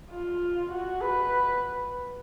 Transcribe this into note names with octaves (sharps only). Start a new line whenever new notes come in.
F4
F#4
B4